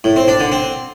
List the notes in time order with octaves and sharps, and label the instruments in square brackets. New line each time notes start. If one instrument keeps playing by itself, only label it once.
[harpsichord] A2
C4
D4
D3
C4